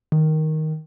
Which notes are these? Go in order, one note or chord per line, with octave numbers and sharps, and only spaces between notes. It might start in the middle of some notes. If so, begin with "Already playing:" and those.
D#3